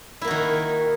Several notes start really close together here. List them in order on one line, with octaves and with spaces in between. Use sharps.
E4 A#3 F#4 D#3